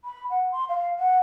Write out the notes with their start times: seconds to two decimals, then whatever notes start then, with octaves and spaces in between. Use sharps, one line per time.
0.04 B5
0.30 F#5
0.52 C6
0.69 F5
0.99 F#5